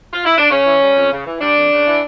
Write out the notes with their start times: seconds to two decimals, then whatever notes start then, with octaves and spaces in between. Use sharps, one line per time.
0.13 F4
0.24 E4
0.38 D4
0.50 C#3 C#4
0.65 E3
0.81 G3
0.95 F2
1.11 C#3
1.25 E3
1.41 G3 D4
1.55 F2
1.71 C#3
1.86 E3